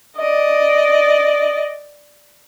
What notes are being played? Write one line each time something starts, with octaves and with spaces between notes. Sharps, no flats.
D5 D#5